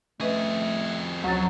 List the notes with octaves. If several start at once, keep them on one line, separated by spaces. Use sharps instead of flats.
F2 A3 C#4 G#4 B4 D#5
D2 F#3 C#4 A6